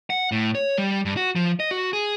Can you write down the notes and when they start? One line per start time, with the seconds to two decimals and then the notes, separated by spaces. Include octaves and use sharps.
0.10 F#5
0.32 A2
0.55 C#5
0.78 G3
1.05 G2
1.17 F#4
1.35 F3
1.60 D#5
1.71 F#4
1.93 G#4